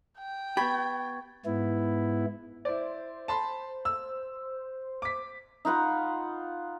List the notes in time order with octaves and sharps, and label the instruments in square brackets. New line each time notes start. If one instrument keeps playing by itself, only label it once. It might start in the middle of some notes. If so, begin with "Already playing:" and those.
[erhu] G5
[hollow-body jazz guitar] B3 G4 [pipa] B5 [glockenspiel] C#6 G#6 A6
[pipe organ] G#2 B3 E4
[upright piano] E4 D5 [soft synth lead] C5
[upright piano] A5 B5 C6
E6
D6 B6
[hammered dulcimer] D#4 F4 F#5 B5